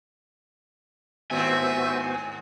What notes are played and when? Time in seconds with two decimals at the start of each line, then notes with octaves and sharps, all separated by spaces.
1.31 D#2 G#2 B3 C4 F#4 C5 E5 G#5